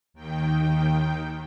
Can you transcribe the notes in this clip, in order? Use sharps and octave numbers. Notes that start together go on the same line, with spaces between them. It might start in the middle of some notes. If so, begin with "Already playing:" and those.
D#2 D#3 G5